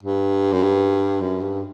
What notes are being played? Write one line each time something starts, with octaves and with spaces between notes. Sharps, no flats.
G2
F#2
G2
F#2
G2